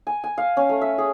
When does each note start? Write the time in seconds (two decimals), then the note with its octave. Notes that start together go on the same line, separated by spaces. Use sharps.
0.07 G#5
0.24 G#5
0.38 F5
0.57 C#4
0.69 A3
0.81 E5
0.98 G#4